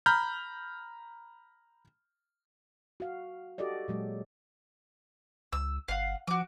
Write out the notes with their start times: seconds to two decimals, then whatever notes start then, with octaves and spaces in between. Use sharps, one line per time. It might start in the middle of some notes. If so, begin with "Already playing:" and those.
0.06 A#5 B5 F6 G6
3.00 F#4 F5
3.58 F#4 G4 A4 D5 D#5
3.88 A#2 F#3 G#3
5.53 C#2 E6
5.88 G1 F5 F#5
6.27 F3 F#4 D6